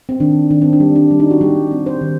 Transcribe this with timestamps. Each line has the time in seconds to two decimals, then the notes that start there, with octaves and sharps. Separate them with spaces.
0.09 C4
0.20 D#3 D4
0.50 D#3 D4
0.62 C4
0.73 D4
0.80 G3
0.96 D4
1.11 G3
1.20 D#4
1.31 F#4
1.41 G3 G4
1.71 C4
1.86 C5
2.01 D#3